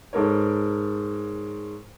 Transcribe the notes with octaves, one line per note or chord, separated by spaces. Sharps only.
G#2 A4 A#4 C#5